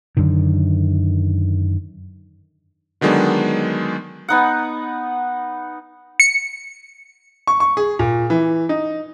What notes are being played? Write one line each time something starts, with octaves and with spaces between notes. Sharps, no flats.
F#2 D3 D#3
D3 D#3 F#3 G#3 B3 D4
B3 D#4 F#5
C#7
C#6
C#6
G#4
A#2
E3
D#4